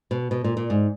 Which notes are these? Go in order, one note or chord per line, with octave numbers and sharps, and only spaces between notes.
B2
B2
A#2
A#2
G#2